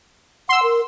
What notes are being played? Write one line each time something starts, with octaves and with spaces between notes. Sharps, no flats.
F#5 C6 E6
A#4